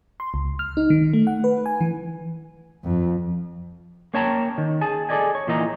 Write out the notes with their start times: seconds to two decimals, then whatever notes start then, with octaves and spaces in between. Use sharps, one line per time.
0.20 C6
0.34 C#2
0.59 F6
0.77 D#4
0.90 D#3
1.13 A3
1.27 F#5
1.44 B4
1.66 G#5
1.81 E3
2.84 F2
4.14 A#3 C#4 C#5 G5 A5 A#5
4.58 D#3
4.81 G#4 G#5 A5
5.09 G#4 A4 C5 D5 D#5 G#5
5.35 C#5
5.47 A#2 D#3 E3 A#3 D#5 A#5